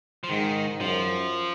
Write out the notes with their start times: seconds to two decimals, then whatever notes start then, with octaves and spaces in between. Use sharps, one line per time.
0.24 F3
0.29 G#2 D#3
0.81 F#2 F3